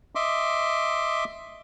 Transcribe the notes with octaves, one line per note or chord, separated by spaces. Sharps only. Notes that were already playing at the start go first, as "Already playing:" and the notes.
D#5 E5 C6 D6